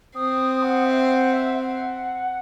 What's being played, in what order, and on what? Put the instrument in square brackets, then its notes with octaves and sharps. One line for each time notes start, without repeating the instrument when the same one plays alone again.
[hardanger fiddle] C4 [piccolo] D#6
[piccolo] F#5
E5
F#5
E5
F#5